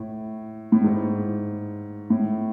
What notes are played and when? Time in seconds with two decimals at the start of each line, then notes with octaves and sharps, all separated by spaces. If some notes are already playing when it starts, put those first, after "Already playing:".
Already playing: A2
0.72 A2
0.84 G#2
2.10 A2